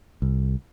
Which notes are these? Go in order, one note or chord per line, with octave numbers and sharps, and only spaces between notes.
C2